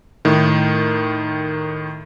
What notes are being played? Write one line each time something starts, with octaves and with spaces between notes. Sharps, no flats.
A2 D#3